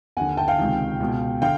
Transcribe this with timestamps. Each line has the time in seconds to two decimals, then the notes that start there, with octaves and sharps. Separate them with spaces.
0.17 D#2 D3 F#5 G#5
0.37 G5 A5
0.48 F5 G5
0.58 C#2 C3 D#3
1.00 C#2 B2
1.42 D3 F5 G5